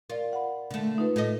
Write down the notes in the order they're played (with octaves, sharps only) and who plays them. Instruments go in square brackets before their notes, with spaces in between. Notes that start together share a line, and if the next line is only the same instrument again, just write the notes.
[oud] F4 [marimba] A#4 D5
[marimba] F#5 B5
[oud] D3 A3
[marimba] D#4 F4 B4
[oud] A2 D#5 [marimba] A4